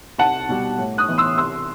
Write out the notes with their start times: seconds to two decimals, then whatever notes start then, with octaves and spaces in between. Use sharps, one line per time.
0.18 C2 F#5 A5
0.49 B2 G3
0.78 A2
0.98 D#6 F#6
1.08 E3 B3
1.18 C6 E6
1.37 C2 C6 E6